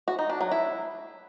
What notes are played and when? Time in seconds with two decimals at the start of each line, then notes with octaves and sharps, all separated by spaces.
0.08 F#4
0.19 D#4
0.30 D4
0.41 F#3
0.52 E4